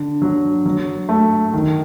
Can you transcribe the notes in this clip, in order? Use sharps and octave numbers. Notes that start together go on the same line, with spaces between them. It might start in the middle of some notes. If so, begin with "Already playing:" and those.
Already playing: D3
F#3
F#3
A3
D#3